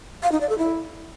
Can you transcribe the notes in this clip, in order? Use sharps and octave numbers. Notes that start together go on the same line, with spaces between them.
F5
D#4
D5
A4
E4